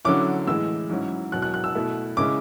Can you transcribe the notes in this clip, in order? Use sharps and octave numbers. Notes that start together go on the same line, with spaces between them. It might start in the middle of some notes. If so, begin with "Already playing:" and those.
D3 F#3 C#4 E4 D6
A2 E3 G#3 E6
G#2 F#3 C#4 E4
E2 B2 F#3 F#6
F#6
F#6
E6
B2 A3 E4
C#3 G#3 C#4 E4 D6